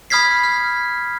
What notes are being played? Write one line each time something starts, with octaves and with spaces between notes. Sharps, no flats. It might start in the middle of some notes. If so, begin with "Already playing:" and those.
B5 D#6 F6 G#6 B6 C7
F6